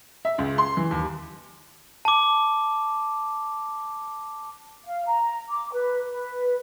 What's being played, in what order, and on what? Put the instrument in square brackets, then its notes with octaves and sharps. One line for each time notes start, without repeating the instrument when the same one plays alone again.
[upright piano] E5
C#2
C6
E3
D#2
[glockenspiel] A5 D6
[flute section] F5
A#5
D6
B4
B4